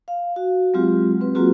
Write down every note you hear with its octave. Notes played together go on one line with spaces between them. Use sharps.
F5
F#4
F#3 G#3 C4 F4 G4
C4 B4
F#3 A#3 C4 F4 F#4 G#4